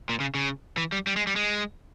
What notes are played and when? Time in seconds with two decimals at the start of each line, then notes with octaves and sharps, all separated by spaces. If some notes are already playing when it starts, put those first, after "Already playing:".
0.09 A#2
0.20 C#3
0.35 C#3
0.78 E3
0.92 G3
1.07 G3
1.16 G#3
1.27 G3
1.36 G#3